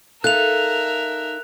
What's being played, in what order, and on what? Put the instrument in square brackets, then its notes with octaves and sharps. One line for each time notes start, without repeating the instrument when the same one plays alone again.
[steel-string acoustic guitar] D#4 A4 F5 [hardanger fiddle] A#4 E5 [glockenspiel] F#6 F7